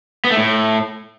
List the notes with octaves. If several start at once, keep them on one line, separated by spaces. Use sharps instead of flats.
B3
A3
A2